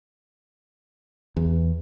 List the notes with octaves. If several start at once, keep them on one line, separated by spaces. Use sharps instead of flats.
E2